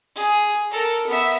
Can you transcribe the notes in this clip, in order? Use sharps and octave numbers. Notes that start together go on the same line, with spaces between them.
G#4
A4 A#4
B3 E5